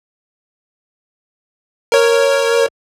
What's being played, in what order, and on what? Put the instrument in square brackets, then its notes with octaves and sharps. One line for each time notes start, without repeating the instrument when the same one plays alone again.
[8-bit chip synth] A#4 C#5